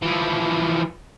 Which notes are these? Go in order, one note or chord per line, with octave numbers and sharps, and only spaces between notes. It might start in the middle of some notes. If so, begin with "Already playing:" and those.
E3 F3